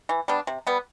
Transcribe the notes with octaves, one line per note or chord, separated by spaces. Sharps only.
E3
G3 B3 D4
C3
G3 B3